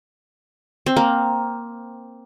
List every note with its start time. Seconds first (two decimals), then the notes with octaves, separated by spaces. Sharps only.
0.86 C4
0.97 A#3